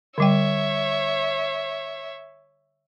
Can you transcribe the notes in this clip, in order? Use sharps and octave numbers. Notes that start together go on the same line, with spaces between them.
D3 G3 C#5 E5 G5